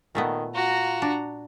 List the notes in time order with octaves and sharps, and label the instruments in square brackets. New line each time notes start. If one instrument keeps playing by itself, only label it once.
[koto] A#2 A3 B3 [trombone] D#3
[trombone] F4 [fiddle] F#4 A#5
[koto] D4